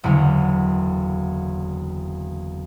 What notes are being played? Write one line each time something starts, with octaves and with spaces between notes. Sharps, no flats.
F#1 E2 D3 F#3 F6